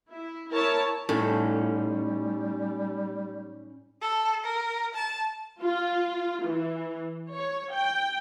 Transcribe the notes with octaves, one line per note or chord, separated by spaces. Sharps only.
E4
E4 A#4 C#5 A5
A2 G3 C#4 D#4 G#4
A4
A#4
A5
F4
E3
C#5
G5